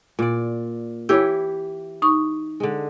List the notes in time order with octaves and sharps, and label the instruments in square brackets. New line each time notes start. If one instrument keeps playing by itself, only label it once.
[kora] A#2 D5
[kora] E3 E4 [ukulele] G4 C#5 [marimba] E6
[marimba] D#4 C#6
[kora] D3 G#3